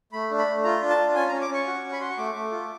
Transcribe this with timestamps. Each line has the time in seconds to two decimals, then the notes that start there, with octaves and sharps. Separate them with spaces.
0.13 A3 B5
0.31 D4
0.38 B5
0.47 A3
0.64 F4 A#5
0.81 D4
0.90 A5
0.98 F4
1.15 C#4 G#5
1.29 C#4 A#5
1.41 D6
1.50 C#4 C#6
1.66 F#4
1.84 C#4
1.92 B5
2.01 F#4 C6
2.09 C#6
2.18 A3 D6
2.34 A3
2.51 F4